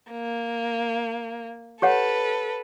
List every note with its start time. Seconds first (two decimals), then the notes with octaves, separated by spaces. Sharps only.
0.12 A#3
1.82 G4 A4 B4 C#5 F#5